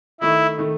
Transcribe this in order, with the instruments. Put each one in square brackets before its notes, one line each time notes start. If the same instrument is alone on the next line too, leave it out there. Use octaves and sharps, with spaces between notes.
[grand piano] D#3 A3 D#4 [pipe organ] E4
[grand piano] D#3 A3 D#4